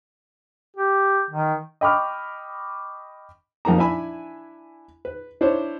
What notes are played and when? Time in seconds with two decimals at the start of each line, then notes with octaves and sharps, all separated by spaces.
0.77 G4
1.30 D#3
1.81 D#5 G5 B5 C#6 D6 F6
3.65 F2 A#3 D#4 A#5
3.78 D4 E4 E5 G#5 B5
5.05 B4
5.41 D4 E4 C5 C#5